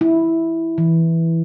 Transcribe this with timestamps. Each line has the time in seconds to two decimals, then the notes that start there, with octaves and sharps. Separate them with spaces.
0.01 E4
0.78 E3